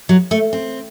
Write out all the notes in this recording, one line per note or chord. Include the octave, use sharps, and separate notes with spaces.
F#3
A3
C4